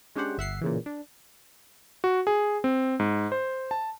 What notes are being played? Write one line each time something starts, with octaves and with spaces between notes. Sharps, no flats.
G#3 C#4 D4 G4 C5 F#5
G1 E5 F#5 C7
A#2 C#3 E3
D4
F#4
G#4
C4
G#2
C5
A5